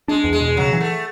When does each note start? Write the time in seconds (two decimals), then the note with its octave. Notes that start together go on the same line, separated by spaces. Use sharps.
0.08 G#3 D4
0.24 E2
0.33 G#3
0.41 B2
0.57 C#3 F#3
0.73 E3
0.80 A3